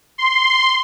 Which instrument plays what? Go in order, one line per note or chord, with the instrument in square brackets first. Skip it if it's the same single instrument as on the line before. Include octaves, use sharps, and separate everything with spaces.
[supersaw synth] C6